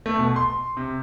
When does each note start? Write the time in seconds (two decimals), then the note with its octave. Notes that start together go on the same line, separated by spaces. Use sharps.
0.06 A3
0.18 B2
0.36 C6
0.77 C3